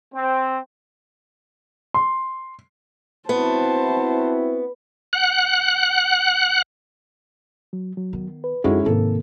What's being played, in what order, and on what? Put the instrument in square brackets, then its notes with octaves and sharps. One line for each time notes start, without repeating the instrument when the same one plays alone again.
[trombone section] C4
[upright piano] C6
[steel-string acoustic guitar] B3 [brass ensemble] C4 E4 F#4 [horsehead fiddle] C5 A5
[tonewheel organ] F#5 F#6
[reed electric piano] F#3
F#3
[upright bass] D#3 B3
[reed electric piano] B4
[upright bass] F#2 F3 [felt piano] G#3 C#4 E4 [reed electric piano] D#4 F#4 A4
[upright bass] G#2 [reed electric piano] C3 D#3 A#3 [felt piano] A4